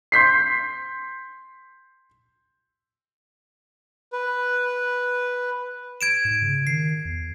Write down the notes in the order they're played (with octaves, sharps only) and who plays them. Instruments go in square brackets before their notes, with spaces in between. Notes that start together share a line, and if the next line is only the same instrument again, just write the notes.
[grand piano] C6 G6 B6 C7
[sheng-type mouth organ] B4
[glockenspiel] G#6 D7 E7
[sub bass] G#2
C#3
[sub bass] D#3 [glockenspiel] C7
[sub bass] E2